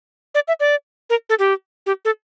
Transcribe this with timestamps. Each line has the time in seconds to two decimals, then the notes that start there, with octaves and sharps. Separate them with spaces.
0.35 D5
0.48 E5
0.60 D5
1.10 A#4
1.30 A4
1.39 G4
1.86 G4
2.05 A4